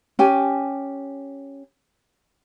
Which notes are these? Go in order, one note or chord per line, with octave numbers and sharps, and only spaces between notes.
C#4 G4 G#5